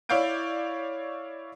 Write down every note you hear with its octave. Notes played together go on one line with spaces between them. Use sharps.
E4 C#5 D5 F5 G6 D7